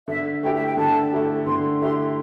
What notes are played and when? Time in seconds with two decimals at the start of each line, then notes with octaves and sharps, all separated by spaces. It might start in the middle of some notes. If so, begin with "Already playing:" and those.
0.08 D3 E5
0.43 A3 E4 G4 G5
0.54 E5
0.66 G5
0.77 D3 A5
1.13 A3 E4 G4
1.46 D3 C6
1.81 A3 E4 G4 C6